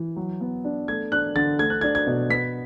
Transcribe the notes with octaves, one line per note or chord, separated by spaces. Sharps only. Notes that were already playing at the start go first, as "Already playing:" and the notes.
Already playing: E3
F#3
B3
D4
A3 G#6
D4 F#6
D3 A6
A3 G#6
F#6
D4 G#6
G#6
B2
B3 B6